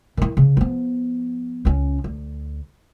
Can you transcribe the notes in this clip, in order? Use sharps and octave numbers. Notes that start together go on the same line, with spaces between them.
D#3 E4
C#3
F3 B3
C#2 C#4
D2